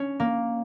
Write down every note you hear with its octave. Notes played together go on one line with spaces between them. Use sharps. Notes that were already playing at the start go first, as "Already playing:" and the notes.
Already playing: C#4
A#3